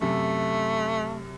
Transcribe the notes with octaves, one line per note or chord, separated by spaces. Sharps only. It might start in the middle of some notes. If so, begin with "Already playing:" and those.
F#2 C3 A3